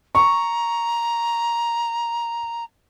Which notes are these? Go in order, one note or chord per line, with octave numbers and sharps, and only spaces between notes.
A#5 C#6